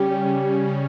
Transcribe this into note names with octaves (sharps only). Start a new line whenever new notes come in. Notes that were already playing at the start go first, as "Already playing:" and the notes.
Already playing: C#3 G3 C#4 G4
C#3
G3 C#4